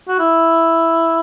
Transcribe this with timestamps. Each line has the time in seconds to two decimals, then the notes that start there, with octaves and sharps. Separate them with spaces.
0.08 F#4
0.19 E4